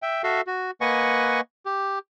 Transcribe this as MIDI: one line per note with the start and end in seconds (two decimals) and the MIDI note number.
0.03 0.22 76
0.03 0.22 79
0.24 0.41 66
0.24 0.41 69
0.24 0.41 76
0.24 0.41 77
0.47 0.71 66
0.81 1.41 58
0.81 1.41 71
0.81 1.41 75
0.81 1.41 78
0.81 1.41 80
0.81 1.41 85
1.66 1.99 67